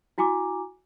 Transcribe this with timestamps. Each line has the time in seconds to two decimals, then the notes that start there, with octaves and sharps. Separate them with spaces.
0.18 E4 F#4 G#5 A#5 D6